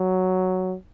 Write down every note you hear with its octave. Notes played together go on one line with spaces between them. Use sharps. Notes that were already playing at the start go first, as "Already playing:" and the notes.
Already playing: F#3